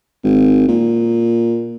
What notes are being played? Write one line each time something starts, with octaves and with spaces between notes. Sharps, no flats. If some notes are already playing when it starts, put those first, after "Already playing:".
G#1
A#2